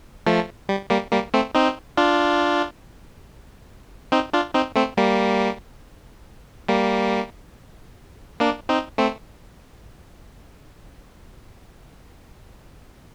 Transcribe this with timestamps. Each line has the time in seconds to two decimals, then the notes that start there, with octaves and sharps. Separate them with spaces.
0.27 F3 A3
0.69 G3
0.90 G3 A#3
1.12 G3 A#3
1.34 A3 C4
1.55 C4 D#4
1.97 D4 F4
4.12 C4 D#4
4.33 D4 F4
4.54 C4 D#4
4.76 A3 C4
4.97 G3 A#3
6.69 G3 A#3
8.40 A#3 D4
8.69 C4 D#4
8.98 A3 C4